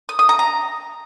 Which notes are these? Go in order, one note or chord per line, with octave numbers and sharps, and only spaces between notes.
D#6
D#6
A#5
A#5